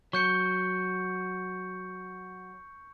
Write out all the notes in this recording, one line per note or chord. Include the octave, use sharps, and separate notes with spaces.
F#3 C#6 G6 C#7